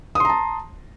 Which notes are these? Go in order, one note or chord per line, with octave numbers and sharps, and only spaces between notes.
A5 A#5 C6 D#6